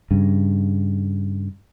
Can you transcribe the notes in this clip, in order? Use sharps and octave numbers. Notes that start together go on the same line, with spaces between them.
G2 C#3